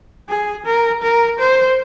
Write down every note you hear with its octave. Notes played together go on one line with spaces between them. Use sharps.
G#4
A#4
A#4
C5